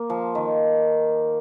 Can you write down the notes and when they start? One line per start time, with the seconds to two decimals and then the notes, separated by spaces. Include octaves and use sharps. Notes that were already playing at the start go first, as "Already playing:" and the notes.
Already playing: A#3
0.10 F3
0.35 D#3